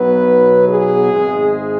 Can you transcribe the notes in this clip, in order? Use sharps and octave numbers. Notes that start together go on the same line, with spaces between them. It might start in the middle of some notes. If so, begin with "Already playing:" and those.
Already playing: B1 B2 F#3 B3 B4
G#4
G#1 G#2 G#3